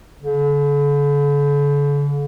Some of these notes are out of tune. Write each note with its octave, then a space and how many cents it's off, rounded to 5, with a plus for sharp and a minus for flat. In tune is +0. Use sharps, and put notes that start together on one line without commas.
D3 -45